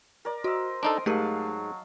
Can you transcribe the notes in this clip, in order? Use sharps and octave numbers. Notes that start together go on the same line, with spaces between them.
A#4 D5
F#4 C5 D#5 E6
D4 D#4 A4 A#5 C6 D#6 D7
G#2 F#3 A3 G4 A#4 F5 A5